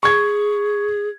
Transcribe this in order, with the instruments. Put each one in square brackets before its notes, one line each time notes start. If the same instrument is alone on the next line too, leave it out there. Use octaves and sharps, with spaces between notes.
[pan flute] G#4 [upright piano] C#6 G#6